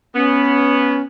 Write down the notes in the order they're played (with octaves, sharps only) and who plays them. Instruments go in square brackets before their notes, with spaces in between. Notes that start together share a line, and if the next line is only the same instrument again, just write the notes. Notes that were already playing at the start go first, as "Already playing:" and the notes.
[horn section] B3 [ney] C#4